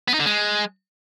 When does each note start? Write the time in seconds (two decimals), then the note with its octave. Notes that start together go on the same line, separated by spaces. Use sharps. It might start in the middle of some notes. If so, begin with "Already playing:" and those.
0.08 B3
0.14 D#4
0.20 D3
0.26 G#3